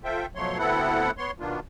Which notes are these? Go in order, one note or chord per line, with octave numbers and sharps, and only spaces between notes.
F4 A4 C5 E5 G5
B2 F3 F#3 A3 C#5 C6
D2 B3 C4 E4 A4 F#5
B3 C#5 C6
B2 D#3 A#3 B3 D4 F4